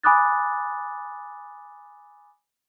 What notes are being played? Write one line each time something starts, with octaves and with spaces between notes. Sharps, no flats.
G#5 B5 D6 D#6 F#6 A6